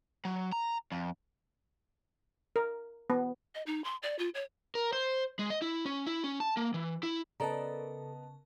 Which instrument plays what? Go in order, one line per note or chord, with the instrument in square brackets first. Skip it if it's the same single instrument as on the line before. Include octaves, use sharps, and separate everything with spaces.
[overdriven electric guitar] F#3
A#5
F2
[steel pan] A#4
B3
[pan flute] D#5
D#4
C6
D5
F4
C#5
[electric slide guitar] A#4
C5
G#3
D#5
E4
C#4
E4
C#4
A5
A#3
E3
E4
[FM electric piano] C#3 A#4 A5 [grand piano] B3 D#5 A#5 [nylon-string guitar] A4 D5